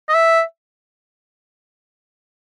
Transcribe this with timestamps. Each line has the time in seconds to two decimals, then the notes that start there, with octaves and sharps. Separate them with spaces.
0.09 D#5
0.14 E5